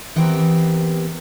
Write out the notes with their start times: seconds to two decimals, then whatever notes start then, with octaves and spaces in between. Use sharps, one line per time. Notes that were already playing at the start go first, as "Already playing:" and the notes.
0.16 E3 B3 C4 G4 A#4